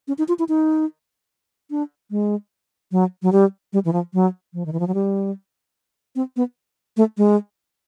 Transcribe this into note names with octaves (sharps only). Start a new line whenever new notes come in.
C#4
D#4
F4
E4
D#4
D4
G#3
F#3
F#3
G3
G3
E3
F3
F#3
F3
D#3
E3
F3
F#3
G3
C4
B3
A3
G#3